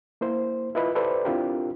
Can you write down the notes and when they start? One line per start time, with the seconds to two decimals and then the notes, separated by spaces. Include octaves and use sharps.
0.21 A#3 E4 C5
0.75 E4 F4 B4 D#5 E5 B5
0.95 G4 A4 B4 C5 D5 E5
1.25 C4 D4 E4 F4 G4 A#4